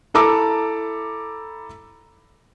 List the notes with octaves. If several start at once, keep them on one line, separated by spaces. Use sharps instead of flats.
E4 A4 A#5 D6